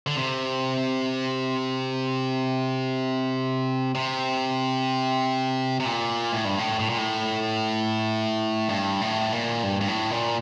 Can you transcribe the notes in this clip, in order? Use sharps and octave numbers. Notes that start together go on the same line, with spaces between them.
D3
C3
C3
C3
A#2
A2
G2
A2
A2
A#2
A2
G2
A2
A#2
G2
G2
A2
A#2